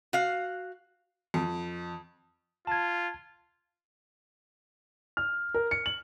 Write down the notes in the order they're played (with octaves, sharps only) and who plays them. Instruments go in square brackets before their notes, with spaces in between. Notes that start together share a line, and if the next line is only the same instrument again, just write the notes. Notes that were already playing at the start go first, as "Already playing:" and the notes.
[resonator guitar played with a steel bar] F#4 F5
[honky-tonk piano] F2
[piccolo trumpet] F4 [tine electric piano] A5 G#6
[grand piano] F6
A#4
C#7
F#7